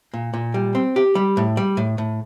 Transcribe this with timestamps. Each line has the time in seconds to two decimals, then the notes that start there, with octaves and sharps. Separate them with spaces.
0.14 A#2
0.34 A#2
0.54 G3
0.75 C4
0.96 G4
1.15 G3
1.37 A2
1.57 G3
1.77 A2
1.98 A2